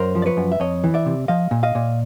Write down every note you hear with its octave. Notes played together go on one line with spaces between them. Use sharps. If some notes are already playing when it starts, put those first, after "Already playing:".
Already playing: F#2 A#4 C5
F3
D5
B4 C#5
F#2
E5
F2 C#5 D#5
E3
D5 E5
C3
F3 D#5 F5
A#2
D#5 F5
A#2